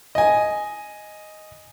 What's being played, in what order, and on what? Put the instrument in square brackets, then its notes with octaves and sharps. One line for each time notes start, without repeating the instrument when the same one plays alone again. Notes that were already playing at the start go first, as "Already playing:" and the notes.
[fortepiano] D#5 G#5